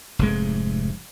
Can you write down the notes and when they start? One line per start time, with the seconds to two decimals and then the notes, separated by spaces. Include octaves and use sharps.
0.19 F1 G#2 G#3